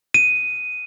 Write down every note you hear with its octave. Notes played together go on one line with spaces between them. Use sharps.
D#7